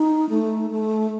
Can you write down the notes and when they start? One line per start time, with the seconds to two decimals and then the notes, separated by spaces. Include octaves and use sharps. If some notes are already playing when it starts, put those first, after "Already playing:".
Already playing: D#4
0.30 A3
0.71 A3